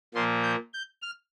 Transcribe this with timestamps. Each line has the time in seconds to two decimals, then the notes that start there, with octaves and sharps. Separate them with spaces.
0.14 A#2 F3 A#3 C6
0.43 G6
0.74 G6
1.02 F6